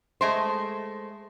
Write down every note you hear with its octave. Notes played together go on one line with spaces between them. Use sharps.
G#3 A3 C5